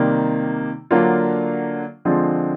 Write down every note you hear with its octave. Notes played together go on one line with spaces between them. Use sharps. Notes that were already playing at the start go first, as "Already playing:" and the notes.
Already playing: C3 D#3 G3 A#3
D3 F#3 A#3 D4 F4
D3 F3 G#3 C4